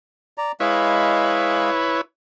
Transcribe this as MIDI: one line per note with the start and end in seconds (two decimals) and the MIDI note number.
0.38 0.52 74
0.38 0.52 82
0.60 1.70 56
0.60 2.01 64
0.60 2.01 71
0.60 2.01 73
0.60 1.70 75
0.60 1.70 77